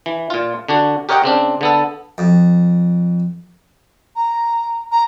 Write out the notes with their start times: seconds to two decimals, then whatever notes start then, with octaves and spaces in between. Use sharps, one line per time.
0.06 E3
0.30 A#2 F4
0.69 D3 D4 F#4
1.09 G4 A#4 C#5 D#5 F#5 G5
1.24 C#3 C4 D4
1.61 D3 B3 A4
2.18 F2
4.16 A#5
4.92 A#5